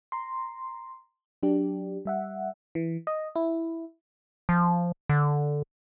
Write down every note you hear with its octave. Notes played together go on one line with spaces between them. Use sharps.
A#5 C6
F#3 D4 G4
G3 E5 F#5
E3
D#5
E4
F3
D3